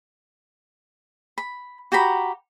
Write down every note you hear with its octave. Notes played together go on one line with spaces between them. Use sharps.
B5
F#4 G4 A#5 B5